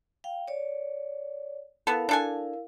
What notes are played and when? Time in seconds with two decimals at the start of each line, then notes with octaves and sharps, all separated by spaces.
0.24 F5 G5
0.48 C#5 D5
1.87 B3 E4 A4 A#4 F5
2.09 D4 A4 G#5